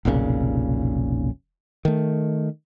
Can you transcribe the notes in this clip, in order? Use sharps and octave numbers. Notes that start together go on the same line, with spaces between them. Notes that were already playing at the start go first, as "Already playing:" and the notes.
F1 B1 A#2 C#3
D#3 A3